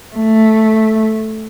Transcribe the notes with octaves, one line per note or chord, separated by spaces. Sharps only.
A3